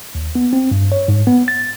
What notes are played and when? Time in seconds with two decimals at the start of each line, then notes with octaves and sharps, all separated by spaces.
0.15 D#2
0.35 B3
0.53 C4
0.71 G2
0.92 C#5
1.08 G#2
1.27 B3
1.48 A6